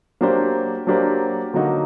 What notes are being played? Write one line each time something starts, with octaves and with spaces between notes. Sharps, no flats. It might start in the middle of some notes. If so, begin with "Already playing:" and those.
F#3 A#3 D4 G4 C5
F#3 A#3 D4 G4 C5
D3 F#3 A#3 D#4 F#4